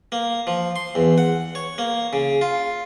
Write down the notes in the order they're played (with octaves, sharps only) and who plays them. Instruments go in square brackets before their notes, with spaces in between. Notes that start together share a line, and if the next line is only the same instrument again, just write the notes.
[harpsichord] A#3
F3
C6
E2
F#5
C#5
A#3
C#3
F4